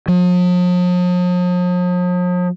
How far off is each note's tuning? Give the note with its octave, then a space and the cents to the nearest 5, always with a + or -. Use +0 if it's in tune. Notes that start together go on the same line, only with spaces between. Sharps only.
F3 +45